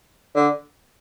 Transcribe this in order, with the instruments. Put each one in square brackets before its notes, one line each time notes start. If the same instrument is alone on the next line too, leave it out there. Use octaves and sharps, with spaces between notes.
[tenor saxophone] D3